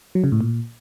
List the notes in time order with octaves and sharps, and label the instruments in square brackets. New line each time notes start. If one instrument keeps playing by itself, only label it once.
[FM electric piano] F#3
C#3
A2
A#2